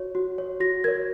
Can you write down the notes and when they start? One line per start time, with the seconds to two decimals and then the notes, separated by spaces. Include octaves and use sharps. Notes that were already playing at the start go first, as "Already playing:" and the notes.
Already playing: F#4 C#5
0.15 F#4
0.38 C#5
0.60 F#4 A#6
0.84 A#4 C#5 G#6